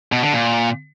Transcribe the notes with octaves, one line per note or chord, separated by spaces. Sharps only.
B2
D3
A#2